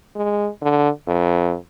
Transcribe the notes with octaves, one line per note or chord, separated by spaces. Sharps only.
G#3
D3
F2